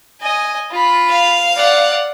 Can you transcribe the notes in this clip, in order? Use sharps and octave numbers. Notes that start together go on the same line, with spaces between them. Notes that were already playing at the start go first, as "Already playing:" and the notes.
D#5 G#5
F4 B5
F5
D5 F#5